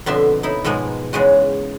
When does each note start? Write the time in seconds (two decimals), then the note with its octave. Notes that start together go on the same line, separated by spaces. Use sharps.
0.06 F2 B2 D3 E5 C6
0.43 D#4 E4
0.64 G#2 B2 F3 G#3 A#3
1.13 E2 C#3 G#3 F#4